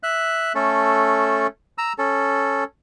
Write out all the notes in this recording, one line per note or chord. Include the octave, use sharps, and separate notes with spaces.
E5 F#6
A3 C#4 A4
A#5 E6
C#4 A4